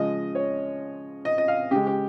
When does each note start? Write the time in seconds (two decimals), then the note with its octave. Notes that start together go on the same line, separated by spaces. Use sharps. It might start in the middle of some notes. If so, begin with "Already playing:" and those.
Already playing: C#3 F3 G#3 D#5
0.35 C#5
1.25 D#5
1.38 D#5
1.48 F5
1.71 C#3 G#3 G4
1.87 G4